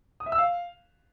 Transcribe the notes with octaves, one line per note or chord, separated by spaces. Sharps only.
D#6
E5
E6
F5